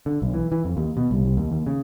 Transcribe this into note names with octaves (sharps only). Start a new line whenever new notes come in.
D3
B1
E3
E3
F2
D#2
B2
C2
C2
D#2
D#2
C#3